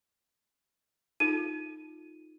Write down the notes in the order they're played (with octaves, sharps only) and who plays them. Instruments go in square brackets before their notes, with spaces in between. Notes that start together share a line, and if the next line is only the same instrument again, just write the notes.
[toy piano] D#4 F4 A4 [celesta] D#7